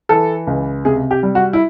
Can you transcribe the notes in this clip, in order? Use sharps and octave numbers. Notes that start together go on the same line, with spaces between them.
E3 A4
C#2
C3 G#4
G4
G3
F#4
E4